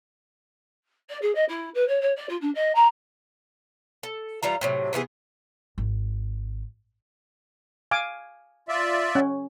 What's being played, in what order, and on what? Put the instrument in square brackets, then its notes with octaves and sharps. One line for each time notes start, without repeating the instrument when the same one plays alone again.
[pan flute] D5
G#4
D#5
E4
B4
C#5
C#5
D5
F4
D4
D#5
A#5
[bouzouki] A4
E3 G3 F4 A#5
A2 C3 F#3
C3 E3 B3 G#4
[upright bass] G#1
[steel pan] F5 G#5 D6
[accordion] F4 D5 E5
[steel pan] C#4